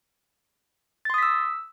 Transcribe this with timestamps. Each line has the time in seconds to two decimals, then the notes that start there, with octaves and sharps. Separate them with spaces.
1.05 A6
1.10 C6
1.14 D#6
1.18 B6
1.23 E6